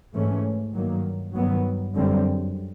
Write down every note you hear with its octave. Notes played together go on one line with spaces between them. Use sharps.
G#2 E3 A3 C#4
G2 D#3 F#3 A#3
G2 D#3 F#3 B3
F#2 D3 G3 C4